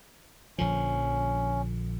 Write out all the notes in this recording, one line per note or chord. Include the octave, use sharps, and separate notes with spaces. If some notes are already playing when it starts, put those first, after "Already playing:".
A#1 D3 F3 C#4